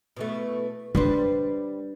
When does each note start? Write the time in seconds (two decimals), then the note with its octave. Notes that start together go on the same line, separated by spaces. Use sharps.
0.16 B2 E3 A3
0.95 G3 D4 B4 C5